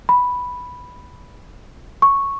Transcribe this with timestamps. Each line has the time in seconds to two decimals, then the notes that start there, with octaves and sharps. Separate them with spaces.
0.09 B5
2.02 C#6